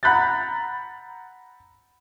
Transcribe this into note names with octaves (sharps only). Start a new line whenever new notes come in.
F#5 A#5 B5 F#6 G6 A6